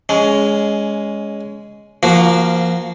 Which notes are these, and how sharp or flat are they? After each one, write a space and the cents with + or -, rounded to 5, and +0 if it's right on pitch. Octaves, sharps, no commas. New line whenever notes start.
G#3 +0 C#4 +15
F3 -20 A#3 +0 F#4 +0